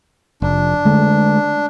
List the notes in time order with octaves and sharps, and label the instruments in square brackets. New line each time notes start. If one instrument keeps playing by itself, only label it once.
[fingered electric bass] F1 [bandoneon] D4
[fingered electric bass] D3 G#3 A3